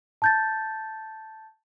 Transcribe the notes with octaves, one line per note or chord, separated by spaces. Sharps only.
A5 G6 A6